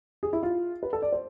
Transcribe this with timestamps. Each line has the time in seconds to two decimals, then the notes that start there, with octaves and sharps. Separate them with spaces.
0.23 G#4
0.33 E4
0.43 F4
0.83 B4
0.93 A4
1.02 D5
1.12 C5